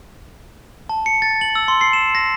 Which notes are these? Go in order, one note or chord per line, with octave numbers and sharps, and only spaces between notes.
A5
C#7
A6
F#7
E6
C6
C7
E7
A#6